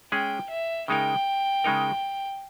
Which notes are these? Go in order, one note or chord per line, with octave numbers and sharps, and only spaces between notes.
G#3 C#4 G#4 G5
E5
C#3 G#3 D#4 A#4 G5
C#3 G#3 D#4 A#4